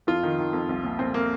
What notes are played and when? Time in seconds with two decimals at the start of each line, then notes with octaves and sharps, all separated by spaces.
0.07 F2 F4
0.23 D#3
0.38 D#3
0.53 F2
0.69 C2
0.84 A#2
0.99 A#2 C4
1.14 A#3